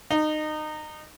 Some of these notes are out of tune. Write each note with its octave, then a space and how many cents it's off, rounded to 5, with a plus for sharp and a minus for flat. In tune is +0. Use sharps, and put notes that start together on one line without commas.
D#4 -25